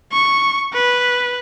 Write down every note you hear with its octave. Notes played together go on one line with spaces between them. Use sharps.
C#6
B4